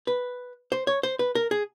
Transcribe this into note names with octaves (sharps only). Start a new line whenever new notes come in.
B4
C5
C#5
C5
B4
A#4
G#4